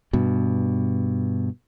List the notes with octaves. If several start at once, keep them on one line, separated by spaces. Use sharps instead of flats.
G2 B2